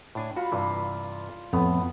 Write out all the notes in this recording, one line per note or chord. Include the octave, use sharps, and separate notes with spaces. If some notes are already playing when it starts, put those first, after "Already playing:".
A2 D4 G#5
F4 F#4 B5
G2 C3 E3
F2 A2 A3 B3